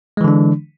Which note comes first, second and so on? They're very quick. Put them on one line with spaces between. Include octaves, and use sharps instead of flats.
G#3 E3 D3 D4